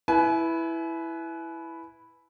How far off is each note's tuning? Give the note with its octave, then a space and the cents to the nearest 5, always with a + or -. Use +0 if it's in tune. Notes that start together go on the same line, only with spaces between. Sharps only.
E4 +0 B4 +0 G#5 +35